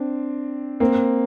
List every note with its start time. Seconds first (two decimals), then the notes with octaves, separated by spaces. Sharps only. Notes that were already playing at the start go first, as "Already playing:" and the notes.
Already playing: C4 D4
0.80 A#3 C4